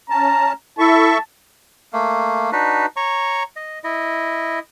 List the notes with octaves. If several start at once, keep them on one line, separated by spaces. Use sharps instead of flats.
C#4 A5 A#5
E4 A4 E5 A5 C#6
A3 A#3
D4 D#4 F#4 B4
C#5 A#5 C#6
D#5
E4 D#5